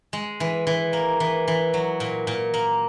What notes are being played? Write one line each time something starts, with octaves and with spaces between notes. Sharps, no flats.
G#3
E3
E3
A#3
E3
E3
F#3
A#2
A#2
A#3